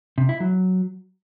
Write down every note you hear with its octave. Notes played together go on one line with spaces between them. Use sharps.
C3
E4
F#3